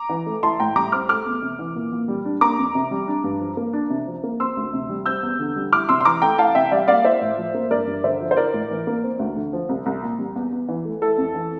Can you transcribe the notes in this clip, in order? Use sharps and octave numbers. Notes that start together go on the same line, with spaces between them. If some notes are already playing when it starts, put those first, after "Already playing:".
Already playing: A#5 D6
E3
A3
E4 A5 C6
A2 G5 A#5
G3 A#5 D6
C4 D6 F6
A3 D6 F6
E2
C3
E3
A#2
A#2
G3
D4
A#3 A#5 D6
F2
C3
G3
D4
G2
F3
A#3
D4
C3
F3
A#3
C4 C6 E6
D2
C3
G3
C4 E6 G6
E2
D3
G3
E4 D6 F6
C3 C6 E6
C6
E3 A#5 D6
A3 G5 A#5
E4 F5 A5
C3 E5 G5
G3 D5 F5
A#3 D5 F5
E4 C5 E5
A2
F3
A#3
G2 A#4 D5
G2
D3 C5 E5
F3
C5
E4 A#4 D5
A2
E3
A#3
C4
D2
D3
F3
C2
C2
A#2
G3
E2
E2
E3
A3
E4 A4
F2
E3